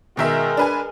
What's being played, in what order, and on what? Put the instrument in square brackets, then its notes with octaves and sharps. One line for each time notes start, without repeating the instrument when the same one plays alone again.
[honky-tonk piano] B2 D#3 E5 [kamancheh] G#3 A#4
[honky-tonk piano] D4 B4 G#5